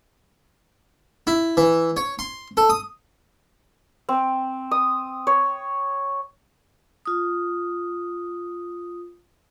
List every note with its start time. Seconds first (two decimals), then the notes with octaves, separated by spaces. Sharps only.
1.27 E4
1.57 E3
1.97 C#5
2.19 C6
2.57 A4
2.70 D#6
4.09 C4
4.71 D#6
5.27 C#5
7.06 F4 D#6